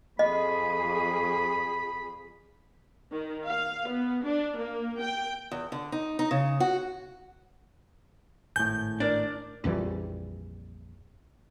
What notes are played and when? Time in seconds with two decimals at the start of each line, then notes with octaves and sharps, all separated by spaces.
0.19 F2 G#4 D#5 B5
3.10 D#3
3.46 F5
3.88 B3
4.23 D4
4.57 A#3
5.01 G5
5.51 E2
5.72 D3
5.92 D#4
6.19 D#4
6.31 C#3
6.60 F#4
8.56 G#1 A2 G#5 G6
9.00 D4 A#4 D5
9.64 A#1 F2 E3 G3